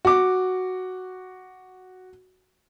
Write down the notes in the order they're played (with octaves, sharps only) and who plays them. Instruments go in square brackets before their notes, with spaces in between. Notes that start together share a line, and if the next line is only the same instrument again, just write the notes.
[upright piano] F#4 D6